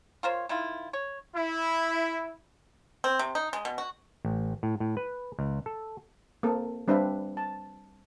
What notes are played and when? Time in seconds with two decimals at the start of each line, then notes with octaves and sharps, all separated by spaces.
0.23 F4 A#4 C5 C#5
0.49 D#3 E4 F4
0.93 C#5
1.36 E4
3.04 C4
3.19 C3
3.35 D#4
3.53 G#3
3.65 B2
3.78 F#4
4.25 A1
4.63 A2
4.80 A2
4.97 B4
5.39 C#2
5.66 A4
6.43 A#3 C4 A4
6.88 G3 C4 D4 B4 E5 F5
7.37 A5